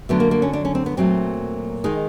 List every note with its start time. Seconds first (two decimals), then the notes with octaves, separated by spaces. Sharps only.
0.09 D3 F#3 A3 B3
0.20 A#3
0.31 A#3
0.42 C#4
0.53 D4
0.65 C#4
0.75 C4
0.86 B3
0.97 A#2 F#3 A3 C4
1.84 D#3 G#3 D#4